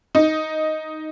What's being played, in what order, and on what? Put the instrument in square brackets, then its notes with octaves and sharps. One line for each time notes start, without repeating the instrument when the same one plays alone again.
[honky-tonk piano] D#4